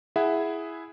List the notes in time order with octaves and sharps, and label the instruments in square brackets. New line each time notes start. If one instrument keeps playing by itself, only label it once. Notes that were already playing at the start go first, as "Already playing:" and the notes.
[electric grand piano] E4 G#4 E5 F#5